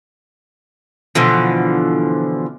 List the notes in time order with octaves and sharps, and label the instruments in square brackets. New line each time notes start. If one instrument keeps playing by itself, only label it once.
[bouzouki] B2 D3 E3 F3